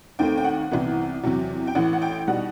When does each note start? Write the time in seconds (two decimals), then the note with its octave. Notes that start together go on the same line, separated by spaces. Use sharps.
0.19 D#2 D#3 A3 C4 G5
0.38 G5
0.44 F#5
0.71 C2 C3 E3 B3
1.24 E2 C3 F#3
1.67 G5
1.75 A1 A2 E3 F#5
1.93 F#5
2.02 G5
2.27 B2 G3 D#4 F#5